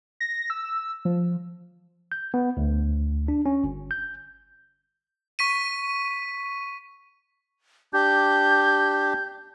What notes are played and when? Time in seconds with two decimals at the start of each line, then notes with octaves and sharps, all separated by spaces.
0.20 A#6
0.50 E6
1.05 F3
2.12 G6
2.34 B3
2.57 D2
3.28 D4
3.46 C#4
3.64 G1
3.91 G6
5.39 C#6 B6 D#7
7.93 D4 G4 G6